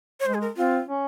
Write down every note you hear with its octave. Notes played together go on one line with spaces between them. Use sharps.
C#5
G#3 C5
G#4
A#4
C4 F4
C#4